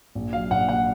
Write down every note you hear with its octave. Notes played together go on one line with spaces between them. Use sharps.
A#1
F#3 F5
A#1 F#5
A#2 F#5